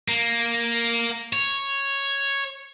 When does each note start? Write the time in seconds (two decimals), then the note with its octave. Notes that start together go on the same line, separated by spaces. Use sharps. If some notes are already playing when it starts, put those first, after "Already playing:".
0.08 A#3
1.33 C#5